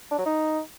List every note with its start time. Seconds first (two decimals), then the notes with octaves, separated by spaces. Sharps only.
0.11 D4
0.18 F#3
0.26 D#4